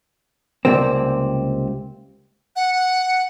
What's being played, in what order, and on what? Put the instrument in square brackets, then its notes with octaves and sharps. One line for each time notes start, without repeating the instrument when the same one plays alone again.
[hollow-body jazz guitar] C#2 C3 G3 A#3 C4
[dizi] F#5